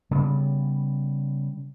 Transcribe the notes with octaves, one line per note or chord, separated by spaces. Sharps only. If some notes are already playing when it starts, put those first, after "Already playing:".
C#3 G3 B3